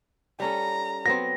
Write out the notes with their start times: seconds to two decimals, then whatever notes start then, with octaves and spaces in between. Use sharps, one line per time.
0.40 G3 C#4 A4 A#5
1.06 F#3 B3 C4 A#6